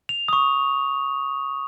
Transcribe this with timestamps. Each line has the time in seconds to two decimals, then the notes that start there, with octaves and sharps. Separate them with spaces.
0.09 F7
0.28 C#6 D#6